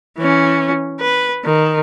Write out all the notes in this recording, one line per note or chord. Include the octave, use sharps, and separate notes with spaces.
E3 C#4
B4
D#3